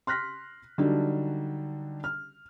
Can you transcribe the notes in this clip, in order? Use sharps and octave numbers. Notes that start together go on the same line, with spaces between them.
C6 F6 F#6 A#6 B6
D3 F#3 G3 D4 D#4
F6